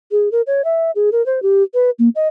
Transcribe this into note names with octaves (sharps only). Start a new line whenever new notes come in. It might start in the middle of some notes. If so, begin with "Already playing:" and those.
G#4
A#4
C#5
E5
G#4
A#4
C5
G4
B4
A#3
D#5